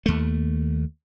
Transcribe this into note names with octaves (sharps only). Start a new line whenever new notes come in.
D#2 A3